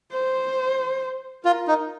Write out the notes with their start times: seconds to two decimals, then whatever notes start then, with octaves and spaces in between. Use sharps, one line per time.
0.12 C5
1.44 F4 A#4
1.68 D#4